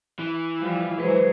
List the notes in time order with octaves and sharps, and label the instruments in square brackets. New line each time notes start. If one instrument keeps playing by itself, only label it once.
[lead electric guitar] E3
[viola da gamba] F3 G3 F4
[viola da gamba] F#3 G#3 G#4 [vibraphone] B4 C5